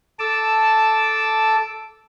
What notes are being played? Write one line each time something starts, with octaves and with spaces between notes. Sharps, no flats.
A4 A5 D6 E6